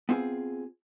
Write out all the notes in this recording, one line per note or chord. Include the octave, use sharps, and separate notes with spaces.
B3 C4 F4 G#4